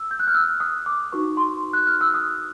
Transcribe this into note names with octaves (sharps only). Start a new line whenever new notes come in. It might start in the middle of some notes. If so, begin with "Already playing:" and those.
Already playing: E6
G6
F#6
F6
E6
D#6
D6
D#4 F#4 B4 C#6
C6
F#6
F6
E6
D#6